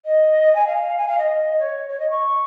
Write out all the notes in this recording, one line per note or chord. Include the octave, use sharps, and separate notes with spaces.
D#5
G#5
F5
G#5
F5
D#5
C#5
C#5
D#5
C#6